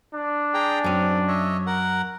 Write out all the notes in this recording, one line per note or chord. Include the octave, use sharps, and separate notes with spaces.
D4
G#4 G5 A#5
F#2 C4 C#4
C#5 D#5 E5
A#4 F#5